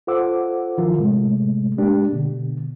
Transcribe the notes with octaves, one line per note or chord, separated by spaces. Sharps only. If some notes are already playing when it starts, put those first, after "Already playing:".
F4 A4 C5 F#5 D6 E6
D#3 F3 E4 F4 A#4
A2 C3 G#3 A3
G#3 A#3 D4 G4
B2 D3